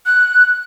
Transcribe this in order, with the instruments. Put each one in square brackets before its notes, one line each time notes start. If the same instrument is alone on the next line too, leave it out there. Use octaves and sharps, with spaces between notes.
[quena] F#6